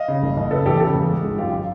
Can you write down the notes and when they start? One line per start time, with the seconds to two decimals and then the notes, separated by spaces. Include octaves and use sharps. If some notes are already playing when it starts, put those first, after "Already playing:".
Already playing: D#5 F5
0.08 C#3
0.23 F#1
0.37 F#1
0.51 C#3 A4 B4
0.66 E2 G4 A4
0.80 C#3 G4 A4
0.94 E2
1.09 G#3
1.24 G#1
1.38 F#2 F4 G4
1.53 D#3 D#4 F4